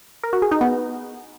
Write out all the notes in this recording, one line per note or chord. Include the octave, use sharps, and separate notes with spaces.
A#4
F#4
G#4
D#4
B3